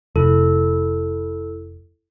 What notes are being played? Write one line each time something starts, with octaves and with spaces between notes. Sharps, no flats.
F1 E4 A4